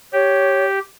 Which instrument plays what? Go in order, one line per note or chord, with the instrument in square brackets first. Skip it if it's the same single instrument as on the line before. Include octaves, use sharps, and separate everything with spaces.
[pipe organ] G4 [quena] C#5